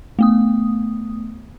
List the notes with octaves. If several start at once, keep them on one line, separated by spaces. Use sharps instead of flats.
A3 B3 D#6